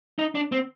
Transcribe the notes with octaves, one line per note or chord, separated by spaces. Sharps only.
D#4
D4
C4